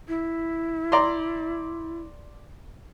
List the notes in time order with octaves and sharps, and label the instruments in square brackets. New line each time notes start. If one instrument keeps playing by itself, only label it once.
[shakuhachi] E4
[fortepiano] D5 A#5 C6